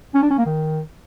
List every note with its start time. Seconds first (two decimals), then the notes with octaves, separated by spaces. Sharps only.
0.15 C#4
0.23 D4
0.30 C#4
0.38 A#3
0.46 D#3